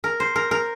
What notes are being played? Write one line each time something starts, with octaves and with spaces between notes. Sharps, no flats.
A#4
C5
A#4
A#4